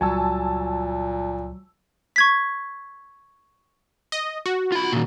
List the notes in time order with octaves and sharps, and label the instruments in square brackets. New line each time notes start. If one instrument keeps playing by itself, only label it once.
[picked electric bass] C#2 G3 [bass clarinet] A#2 [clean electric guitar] F#3 [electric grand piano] G#5 A5 E6
[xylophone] C#6 G#6 B6
[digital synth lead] D#5
F#4
[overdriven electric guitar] F4 B5
A#2 D#3